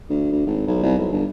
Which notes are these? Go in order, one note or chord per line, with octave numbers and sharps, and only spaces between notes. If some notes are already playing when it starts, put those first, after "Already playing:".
D2
D2
G#1
B1
C2
B1
G1